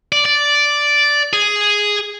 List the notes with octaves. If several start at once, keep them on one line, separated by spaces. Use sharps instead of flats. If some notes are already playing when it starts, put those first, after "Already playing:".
D5
D5
G#4